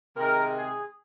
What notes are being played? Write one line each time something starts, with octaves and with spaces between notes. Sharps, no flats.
C3 D#3 G#3 A#4
G#4